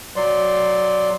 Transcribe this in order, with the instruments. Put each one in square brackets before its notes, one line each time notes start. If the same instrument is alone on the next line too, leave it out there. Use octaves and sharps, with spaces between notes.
[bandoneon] F#3 D5 C6